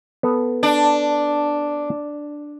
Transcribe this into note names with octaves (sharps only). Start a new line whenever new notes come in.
B3 A4
D4